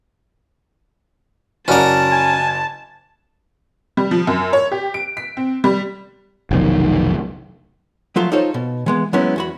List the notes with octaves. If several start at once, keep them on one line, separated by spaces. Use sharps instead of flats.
F#1 C#4 F#4 A#4 D5 A5
G#5
G3
F3
F#2
C#5
G4
D7
B6
C4
G3
F1 B1 D#3
F3 F#3 A3 F4
D#4 F4 A4 C5 C#5
B2
E3 G#3 B3
F#3 G#3 B3 C#4 E4
E2 F#4 B5